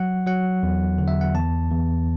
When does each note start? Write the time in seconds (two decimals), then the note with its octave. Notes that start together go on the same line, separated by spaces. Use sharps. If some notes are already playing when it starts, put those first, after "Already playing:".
Already playing: F#3 F#5
0.27 F#3 F#5
0.63 E2
0.98 D3
1.08 E5
1.21 F#5
1.35 E2 A5
1.71 E2